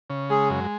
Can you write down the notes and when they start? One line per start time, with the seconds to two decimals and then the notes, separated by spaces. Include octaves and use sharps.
0.10 C#3
0.30 G#3 G#4
0.50 F#2